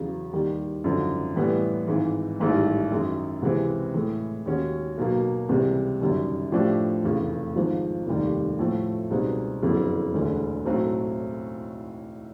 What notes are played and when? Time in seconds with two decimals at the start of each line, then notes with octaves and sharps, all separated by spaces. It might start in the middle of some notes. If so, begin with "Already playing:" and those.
Already playing: E2 C#3 F#3
0.32 D#2 D#3 G3
0.84 G#1 F#2 D3 F3
1.36 A2 E3 G3 B3
1.87 G#1 G#2 E3
2.39 A1 G#2 D#3 G3
2.92 F#2 D#3 G#3
3.42 C#2 C3 E3 G#3 C4
3.94 A2 E3 G#3
4.46 D#2 D#3 G#3 C#4 F#4
4.98 B1 B2 F#3 A#3
5.49 C#2 C3 E3 G3
6.01 G1 F#2 D#3 G3
6.52 A2 F3 A3 D4 G4
7.04 F1 E2 C#3
7.56 G#1 G#2 F3
8.07 F1 D#2 D#3 G3
8.59 A2 F3 A3
9.11 C#2 B2 G3 C4 D#4
9.63 F#1 F2 D3 F#3 B3
10.14 E1 D2 D3
10.65 B1 A2 F#3 A3 C4